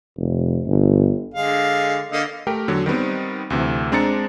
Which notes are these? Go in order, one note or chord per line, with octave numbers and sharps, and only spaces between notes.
F1
G1
D3 G#3 F5
D3 A#3 D#5
A3 G4 A#4 G5
E2 D3 F#3
D#3 G3 B3 C4
D2 C3 E3
G#3 C4 D4 A#5 A6 C#7